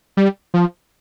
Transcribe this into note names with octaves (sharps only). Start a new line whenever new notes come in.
G3
F3